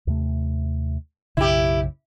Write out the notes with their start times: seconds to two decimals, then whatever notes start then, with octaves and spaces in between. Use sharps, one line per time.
0.07 D#2 C3 A3
1.37 B1 F#2 C#3 E4 G4